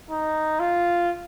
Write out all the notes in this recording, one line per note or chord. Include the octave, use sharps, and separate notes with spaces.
D#4
F4